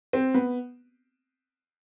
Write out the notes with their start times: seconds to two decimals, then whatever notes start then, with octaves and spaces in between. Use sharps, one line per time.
0.13 C4
0.34 B3